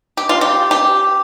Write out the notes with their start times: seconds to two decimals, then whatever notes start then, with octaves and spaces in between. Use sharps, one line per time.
0.17 G4
0.29 F4
0.41 G4
0.71 G4